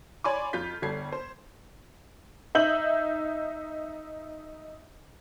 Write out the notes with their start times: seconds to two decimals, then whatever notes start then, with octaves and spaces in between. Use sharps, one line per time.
0.24 C#5 D5 G#5 B5 C6 D6
0.53 F2 F4 G6 B6
0.82 G1 G3 A4 G#6 C7
1.12 C5
2.55 D#4 E5 G6 F#7